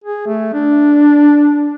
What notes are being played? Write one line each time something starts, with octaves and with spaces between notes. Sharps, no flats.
G#4
A3
D4